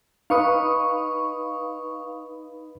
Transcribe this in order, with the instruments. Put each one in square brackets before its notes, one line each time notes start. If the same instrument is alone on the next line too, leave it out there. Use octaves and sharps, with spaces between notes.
[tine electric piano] D#4 B4 B5 [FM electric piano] F5 C#6 D#6